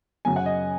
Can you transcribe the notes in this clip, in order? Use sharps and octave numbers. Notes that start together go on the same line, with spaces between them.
F#2 C#3 F#3 G#5
F#5
D#5